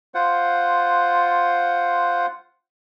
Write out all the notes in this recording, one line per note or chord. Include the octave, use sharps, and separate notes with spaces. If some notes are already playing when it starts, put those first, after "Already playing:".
F4 C5 F#5